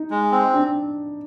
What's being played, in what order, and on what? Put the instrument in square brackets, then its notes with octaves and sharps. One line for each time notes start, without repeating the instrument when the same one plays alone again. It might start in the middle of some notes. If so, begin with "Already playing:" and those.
Already playing: [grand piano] D#4
[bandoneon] G#3
C4
[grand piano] D4